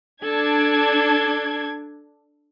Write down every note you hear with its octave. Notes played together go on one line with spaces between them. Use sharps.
D4 A4 G#6